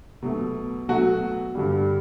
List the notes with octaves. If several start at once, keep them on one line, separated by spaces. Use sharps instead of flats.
B2 F#3 A3
B2 F#3 A3 F#4
G2 D3 G3